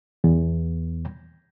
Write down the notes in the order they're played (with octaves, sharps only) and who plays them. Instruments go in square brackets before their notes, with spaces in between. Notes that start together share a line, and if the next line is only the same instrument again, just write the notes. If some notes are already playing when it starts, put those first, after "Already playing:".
[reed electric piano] E2